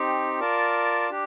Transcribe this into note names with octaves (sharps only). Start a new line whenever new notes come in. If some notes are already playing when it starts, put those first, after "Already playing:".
Already playing: C4 D#4 G4
F4 A#4 D5 A5
D4 G4